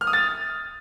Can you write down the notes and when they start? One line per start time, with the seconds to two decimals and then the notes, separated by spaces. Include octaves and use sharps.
0.01 F6
0.07 D#6
0.13 A6